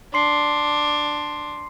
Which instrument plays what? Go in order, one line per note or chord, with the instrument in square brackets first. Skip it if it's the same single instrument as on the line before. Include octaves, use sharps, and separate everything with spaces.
[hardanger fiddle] D4 [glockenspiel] C6 C7